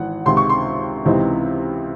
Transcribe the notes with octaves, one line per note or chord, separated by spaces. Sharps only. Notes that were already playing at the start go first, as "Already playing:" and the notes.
Already playing: G#1 E3 F#5
C#2 C3 D#3 C6
C#6
C6
C#2 C3 E3 C4 D#4